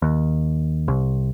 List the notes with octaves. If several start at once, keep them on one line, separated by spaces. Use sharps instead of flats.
D#2
C2